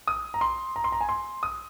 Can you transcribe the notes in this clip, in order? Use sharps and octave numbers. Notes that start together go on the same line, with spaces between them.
D#6
A#5
C6
A#5
C6
A#5
G#5
C6
D#6